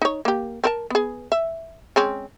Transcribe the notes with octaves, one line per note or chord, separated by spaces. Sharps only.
D#4 C#5
A#3 G4
C4 A#4 A5
B3 G#4
E5
G#3 C4 C#4